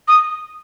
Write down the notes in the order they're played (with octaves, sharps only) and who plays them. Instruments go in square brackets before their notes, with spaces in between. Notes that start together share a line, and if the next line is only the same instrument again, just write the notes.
[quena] D#6